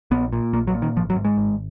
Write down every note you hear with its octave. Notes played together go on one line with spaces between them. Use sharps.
A#1 B3
A#2
A#1 A#3
F#3
A#2
D#3
G#1 F3
F#3
G#2
G#3
G#1